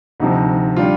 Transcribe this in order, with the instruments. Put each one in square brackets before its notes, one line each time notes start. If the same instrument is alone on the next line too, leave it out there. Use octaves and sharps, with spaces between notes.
[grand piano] D2 C3 F3 D#4
D3 G3 F4